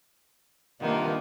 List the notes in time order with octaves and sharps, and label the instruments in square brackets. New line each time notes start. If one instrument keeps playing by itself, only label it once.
[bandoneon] G2 C3 B3 [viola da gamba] D#3 A#3 [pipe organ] D4 F4